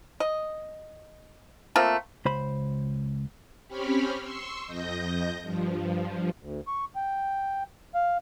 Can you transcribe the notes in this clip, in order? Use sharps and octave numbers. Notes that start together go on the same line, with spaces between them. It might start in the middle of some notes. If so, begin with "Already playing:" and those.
D#5
A3 A#3 C4 F4
C#2 C5 B5
C4 C#4 G4 C#5 B5 F6
C6 C#6 E6
F2 D#5 G6 A#6
G2 F3
D2
C#6
G5
F5